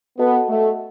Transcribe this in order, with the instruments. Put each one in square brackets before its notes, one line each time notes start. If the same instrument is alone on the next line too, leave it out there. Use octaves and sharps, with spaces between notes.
[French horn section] B3 [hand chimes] F#4 A4 D#5 F#5 A5
[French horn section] A3